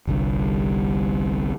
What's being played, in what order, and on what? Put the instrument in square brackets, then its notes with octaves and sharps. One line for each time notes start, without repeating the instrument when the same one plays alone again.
[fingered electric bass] G1 C2 G2